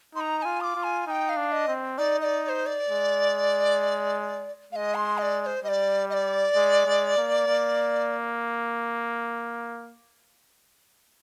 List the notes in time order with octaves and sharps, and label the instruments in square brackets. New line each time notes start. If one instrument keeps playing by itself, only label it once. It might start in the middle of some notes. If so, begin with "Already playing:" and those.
[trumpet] D#4 [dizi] C6
[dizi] A#5
A#5
[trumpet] F4 [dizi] G#5
[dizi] D#6
D6
[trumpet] F4
[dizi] G#5
[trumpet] D#4 [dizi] G#5
[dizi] G5
F5
[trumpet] D4
[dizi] D#5
[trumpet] C4
[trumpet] D#4 [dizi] D5
[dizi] D#5
D5
D5
C5
D5
[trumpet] G#3
[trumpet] G#3 [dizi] D#5 F5
[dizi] C6
D#5
D5
D5
C5
[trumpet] G3 [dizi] D5 D#5
[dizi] D#5
D5
[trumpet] G#3
G#3
A#3
A#3